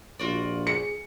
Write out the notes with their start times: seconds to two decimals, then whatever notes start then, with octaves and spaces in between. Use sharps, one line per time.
0.19 A#1 F4 F#4 D5
0.67 G#4 C#7